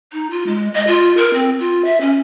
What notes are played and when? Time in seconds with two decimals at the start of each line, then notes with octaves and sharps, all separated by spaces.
0.13 D#4
0.31 F4
0.47 G#3
0.74 D#5
0.88 F4
1.17 A#4
1.34 C4
1.60 F4
1.85 E5
2.01 C#4